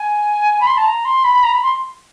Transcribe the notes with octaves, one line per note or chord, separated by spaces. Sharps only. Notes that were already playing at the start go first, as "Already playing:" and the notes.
Already playing: G#5
B5
C6
A5
A#5
C6
B5
A#5
B5
C6